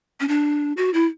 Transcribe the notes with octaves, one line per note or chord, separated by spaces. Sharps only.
C#4
D4
F#4
E4